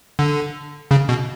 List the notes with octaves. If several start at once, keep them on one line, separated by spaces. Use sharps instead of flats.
D3
C#3
B2